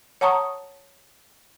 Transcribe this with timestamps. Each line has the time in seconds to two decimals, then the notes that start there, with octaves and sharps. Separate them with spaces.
0.21 C#5 F#5 A5 A#5 C#6 D#6